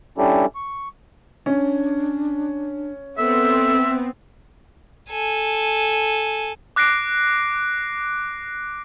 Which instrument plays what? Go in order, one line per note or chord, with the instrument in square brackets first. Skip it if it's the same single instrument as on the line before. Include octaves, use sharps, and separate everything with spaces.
[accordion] G3 C#4 D4 E4 G4 A4
C#6
[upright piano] C#4 [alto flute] D4
[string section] B3 C4 [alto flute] A4 [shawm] E5
[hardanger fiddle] A4 G#5
[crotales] D6 F#6 A#6 C7 D7